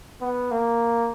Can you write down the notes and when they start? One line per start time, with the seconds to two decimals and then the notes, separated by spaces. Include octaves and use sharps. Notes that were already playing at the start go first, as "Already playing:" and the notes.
0.21 B3
0.51 A#3